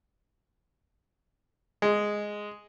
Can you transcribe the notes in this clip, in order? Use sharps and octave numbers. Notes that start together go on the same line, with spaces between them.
G#3